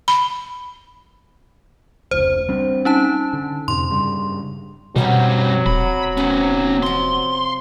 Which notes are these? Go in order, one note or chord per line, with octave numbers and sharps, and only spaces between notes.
B5
F1 C#2 C5
G3 C4 D4
C#4 D#4 A5
D3
F2 G#2 C3 C6
G2 C#3 G3
F#2 B2 F#3 G3 B3 C4 F5
D#1 B5
C3 B3 C#4
F3 F4 C6